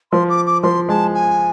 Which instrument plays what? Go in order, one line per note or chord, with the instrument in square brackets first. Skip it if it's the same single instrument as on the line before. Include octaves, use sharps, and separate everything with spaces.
[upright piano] F3 [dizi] C6
[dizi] D6
D6
[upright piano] F3 [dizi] C6
[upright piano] G#3 [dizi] A5
[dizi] G#5